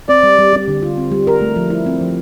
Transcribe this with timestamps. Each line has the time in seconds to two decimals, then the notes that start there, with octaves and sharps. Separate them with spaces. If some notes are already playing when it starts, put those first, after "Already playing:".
0.09 C4 D5
0.23 G3
0.38 G3
0.53 G3
0.68 D3
0.82 F4
0.98 C4
1.12 G3
1.27 A#4
1.41 A3
1.56 F3
1.70 E4
1.86 C4
2.01 F3